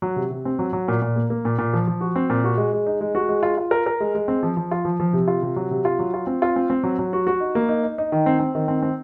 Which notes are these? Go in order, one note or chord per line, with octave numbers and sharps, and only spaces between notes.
F#3
C3
C3
C4
F#3
F#3
A#2
A#2
A#3
A#3
A#2
A#2
F3
F3
F#4
C4
A#2
F#4
G#3
G#3
D#4
G#3
F#4
G#3
F4
F4
A#4
A#4
G#3
G#3
C4
F3
F3
F4
F3
F3
C3
F4
C3
F#3
C3
F4
F#3
F4
C4
F4
C4
C4
F#3
F#3
F#4
F#4
D#4
A#3
D#4
D#4
D#4
D#3
C4
C4
D#3
C4
C4